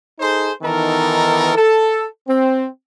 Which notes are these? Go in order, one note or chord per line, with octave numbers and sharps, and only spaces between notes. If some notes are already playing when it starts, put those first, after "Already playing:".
D#4 G#4 A4 C5
D#3 E3 B3 D#4 A4 A#4
A4
C4